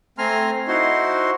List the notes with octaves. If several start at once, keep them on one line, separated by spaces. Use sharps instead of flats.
A3 C4 G#5 A#5 C6 F6
D#4 E4 F#4 C5 C6